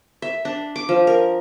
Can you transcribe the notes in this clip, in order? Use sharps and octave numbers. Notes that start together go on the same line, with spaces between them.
E5
D4
D6
F3
A#4